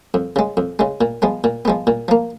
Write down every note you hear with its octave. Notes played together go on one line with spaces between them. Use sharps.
F2
C#3 G#3
F2
C#3 G#3
A#2
F3 G#3 B3
A#2
F3 G#3 B3
A#2
F3 A#3